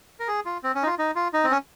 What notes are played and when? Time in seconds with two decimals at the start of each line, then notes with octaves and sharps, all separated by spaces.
0.20 A#4
0.28 G#4
0.45 F4
0.64 C4
0.75 C#4
0.83 D#4
0.87 F4
0.99 D#4
1.16 F4
1.34 D#4
1.44 C4
1.51 C#4